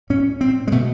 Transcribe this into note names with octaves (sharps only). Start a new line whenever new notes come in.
A2 C#4
C4
G#3
B2 A3